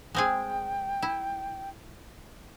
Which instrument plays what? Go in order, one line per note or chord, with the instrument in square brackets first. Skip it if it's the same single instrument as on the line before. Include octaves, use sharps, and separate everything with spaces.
[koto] G#3 C4 G#4 [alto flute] G5
[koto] E4